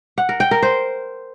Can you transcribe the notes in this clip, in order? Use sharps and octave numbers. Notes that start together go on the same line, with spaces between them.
F#5
A#4
G5
A#4
C5